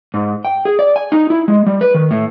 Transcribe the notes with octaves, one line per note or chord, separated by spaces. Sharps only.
G#2
G5
G#4
D5
G#5
D#4
E4
G#3
G3
B4
D#3
A2